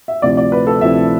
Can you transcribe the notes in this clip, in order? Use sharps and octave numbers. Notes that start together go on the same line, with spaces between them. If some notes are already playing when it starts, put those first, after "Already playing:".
E5
D2 C3 F3 C4 E4 D5
D5
B4
A4
D2 C3 F3 C4 E4 E5